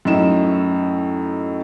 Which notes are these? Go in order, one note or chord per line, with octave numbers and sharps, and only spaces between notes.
F#2 A2 D#4 E7